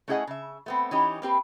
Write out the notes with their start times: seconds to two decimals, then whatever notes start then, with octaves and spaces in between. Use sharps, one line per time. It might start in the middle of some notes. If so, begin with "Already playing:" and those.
0.08 A3 C#4 E4 G#4 D#5 F#5
0.27 C#3 E5
0.66 A3 B3 C4
0.91 E3 C#4 D#4 G4
1.22 A#3 C4 G4 B4